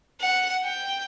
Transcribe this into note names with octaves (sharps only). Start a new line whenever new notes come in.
F#5
G5